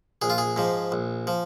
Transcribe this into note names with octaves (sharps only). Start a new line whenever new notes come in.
A#1 G#4
F4
G#4
G#2 F3
A#1
F3